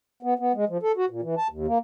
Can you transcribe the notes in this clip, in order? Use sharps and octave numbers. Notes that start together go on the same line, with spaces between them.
B3
B3
G#3
F3
A4
F#4
A#2
E3
A5
D#2
A#3